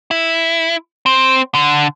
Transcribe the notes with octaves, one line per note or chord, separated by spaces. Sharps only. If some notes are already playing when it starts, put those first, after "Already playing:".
E4
C4
D3